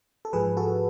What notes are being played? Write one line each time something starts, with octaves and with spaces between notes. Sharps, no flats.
A4
G#2 F3 G#4 B4
F#4 A4